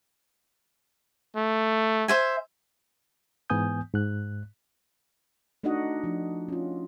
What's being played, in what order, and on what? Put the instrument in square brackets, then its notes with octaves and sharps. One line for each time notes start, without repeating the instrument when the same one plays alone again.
[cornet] A3
[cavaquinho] C5 E5 G#5
[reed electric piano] G#2 E3 B3 G#5 D#6 G6
G#2 F#6
[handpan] A3 D4 D#4 F#4 D#5 F#5
F3 D4
C#4 F4